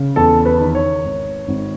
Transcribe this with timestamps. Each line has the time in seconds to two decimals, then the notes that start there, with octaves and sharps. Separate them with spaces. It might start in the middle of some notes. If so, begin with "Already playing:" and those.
Already playing: C#3
0.16 E2 A4
0.45 B4
0.60 D#3
0.75 C#5
1.04 G#1
1.48 G#1